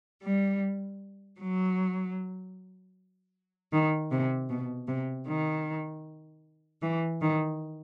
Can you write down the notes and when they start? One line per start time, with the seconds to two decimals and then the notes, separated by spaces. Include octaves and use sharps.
0.22 G3
1.39 F#3
3.72 D#3
4.10 C3
4.49 B2
4.87 C3
5.26 D#3
6.82 E3
7.21 D#3